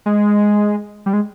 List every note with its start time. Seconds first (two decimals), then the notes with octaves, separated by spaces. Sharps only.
0.06 G#3
1.06 G3
1.13 G#3